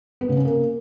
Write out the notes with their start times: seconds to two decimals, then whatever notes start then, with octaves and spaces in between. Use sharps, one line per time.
0.21 B3
0.29 C#3
0.37 C#4
0.45 A#3